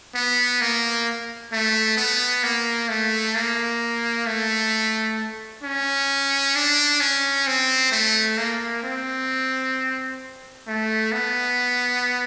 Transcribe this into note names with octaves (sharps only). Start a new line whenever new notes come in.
B3
A#3
A3
B3
A#3
A3
A#3
A3
C#4
D4
C#4
C4
A3
A#3
C4
A3
B3